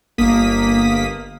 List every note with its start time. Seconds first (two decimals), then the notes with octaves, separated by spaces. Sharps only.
0.18 G1 A#3 D#6 B6